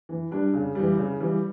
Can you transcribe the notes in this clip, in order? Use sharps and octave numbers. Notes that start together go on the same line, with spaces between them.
E3
G3 D4
C#3
E3 G3
C#3
E3 G3